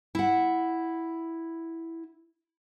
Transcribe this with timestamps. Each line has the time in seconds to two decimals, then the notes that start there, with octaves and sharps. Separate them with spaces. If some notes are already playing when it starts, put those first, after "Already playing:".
0.15 E4 F#5